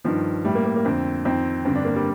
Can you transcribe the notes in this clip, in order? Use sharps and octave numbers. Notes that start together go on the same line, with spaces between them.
G2 D#3 F3
A2 G3
A#3
A#3
A#3
F2 D3 C4
F2 D#3 C4
G2 D3 C4
D4
A#3
G3